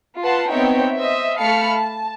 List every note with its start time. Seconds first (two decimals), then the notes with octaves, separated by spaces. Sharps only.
0.21 F4 B4 F#5 A5 C6
0.51 B3 C4 D#4 C#5 E5 G5
0.97 C5 D#5 E5
1.39 A3 F5 A5 B5 F6 C#7
1.74 A5